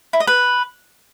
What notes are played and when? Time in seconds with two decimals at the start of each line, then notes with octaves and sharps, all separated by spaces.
0.13 E4
0.20 D#5
0.27 B4